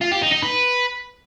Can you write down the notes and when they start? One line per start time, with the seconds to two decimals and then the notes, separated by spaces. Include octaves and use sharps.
0.02 F4
0.12 G4
0.22 D#4
0.32 D#4
0.43 B4